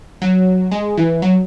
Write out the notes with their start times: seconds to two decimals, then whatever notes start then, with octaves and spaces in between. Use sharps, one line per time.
0.22 F#3
0.71 G#3
0.97 E3
1.22 F#3